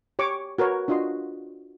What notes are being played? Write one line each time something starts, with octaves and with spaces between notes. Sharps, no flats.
G4 C#5 C#6 D6
F#4 A#4 B4 C#5
D4 F4 F#4 D#5 C6